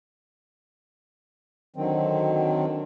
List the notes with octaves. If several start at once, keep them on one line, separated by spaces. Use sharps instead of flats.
D3 D#3 F#3 C4